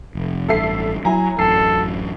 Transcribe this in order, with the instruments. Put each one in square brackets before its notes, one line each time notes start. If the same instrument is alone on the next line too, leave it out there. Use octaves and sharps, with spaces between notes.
[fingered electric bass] F1
[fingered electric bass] A1 G2 [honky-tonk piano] A4 E5 C7
[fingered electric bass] F#3 [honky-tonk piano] E4 G#5 A#5
[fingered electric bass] A1 F#2 [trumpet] A4 [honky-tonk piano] C7